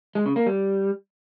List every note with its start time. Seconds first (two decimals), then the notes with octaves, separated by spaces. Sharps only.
0.15 G#3
0.26 C#3
0.36 A#3
0.46 G3